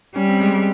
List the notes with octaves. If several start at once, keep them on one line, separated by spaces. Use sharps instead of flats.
G3 C#4
C4
G#3
G#3